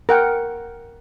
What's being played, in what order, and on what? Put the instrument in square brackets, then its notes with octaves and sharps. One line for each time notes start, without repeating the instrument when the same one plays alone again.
[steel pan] A#4 F#5 G5